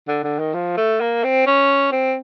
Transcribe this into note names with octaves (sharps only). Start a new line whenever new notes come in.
D3
D3
D#3
F3
A3
A#3
C4
C#4
C4